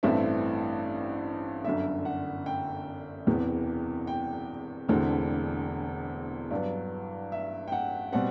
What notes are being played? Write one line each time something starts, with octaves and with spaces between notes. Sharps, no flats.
A1 G2 E3 A3 C4 E5
G1 F#2 D3 E5
F#5
G5
E1 E2 C3 E3
G5
E1 E2 D3 A3 C4
G2 F#3 B3 D5
E5
G5
F#5
B2 G3 C4 F#5